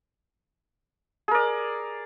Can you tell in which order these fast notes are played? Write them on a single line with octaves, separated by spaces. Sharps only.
G#4 A#4 D5